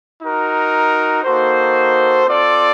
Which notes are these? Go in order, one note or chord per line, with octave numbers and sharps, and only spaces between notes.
D#4 F#4 A#4
A#3 D#4 F#4 A4 C5
C4 F4 A4 D5